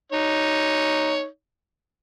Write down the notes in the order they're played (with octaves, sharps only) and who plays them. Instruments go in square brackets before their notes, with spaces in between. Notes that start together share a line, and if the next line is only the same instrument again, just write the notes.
[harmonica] D#4 C#5